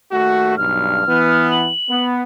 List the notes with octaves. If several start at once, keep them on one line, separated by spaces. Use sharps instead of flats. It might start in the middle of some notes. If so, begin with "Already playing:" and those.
D#2 A3 F#4
B1 G2 F6
E3 B3
F#7
B3